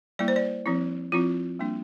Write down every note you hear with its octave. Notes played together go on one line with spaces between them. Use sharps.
G3 A#3 E4 D5
C5
D5
F3 C4 E4
F3 C4 E4 F4
G3 A#3 D4